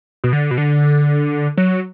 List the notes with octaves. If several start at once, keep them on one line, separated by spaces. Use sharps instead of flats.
B2
D3
B2
D3
F#3